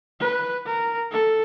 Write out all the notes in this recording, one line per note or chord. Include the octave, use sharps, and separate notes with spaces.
B4
A#4
A4